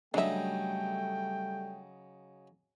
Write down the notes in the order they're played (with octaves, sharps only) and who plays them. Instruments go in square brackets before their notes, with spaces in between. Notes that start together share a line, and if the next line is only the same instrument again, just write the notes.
[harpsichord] C#3 F#3 D#4 [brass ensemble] G3 A3 [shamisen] D4 E5 [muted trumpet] G5